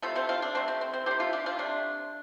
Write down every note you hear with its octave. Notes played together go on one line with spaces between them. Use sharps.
C3 A3 F4 A4
C4 F4
C4 F4
D4
C3 A3 C4
C4
C4
C4
C3 A3 G4 C5
F4 A4
D4 G4
C4 F4
C3 A3 D4